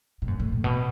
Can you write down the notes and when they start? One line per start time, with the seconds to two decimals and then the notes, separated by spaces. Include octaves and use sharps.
0.22 A2
0.28 F#2
0.40 A2
0.52 A2
0.64 B2